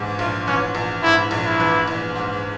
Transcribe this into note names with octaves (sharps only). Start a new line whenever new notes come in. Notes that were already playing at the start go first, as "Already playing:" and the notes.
Already playing: A#1 G#2 E3
A#1 F4
E3 C#4
A#1
G#2 E4
A#1
E4
E3
A#1
G#2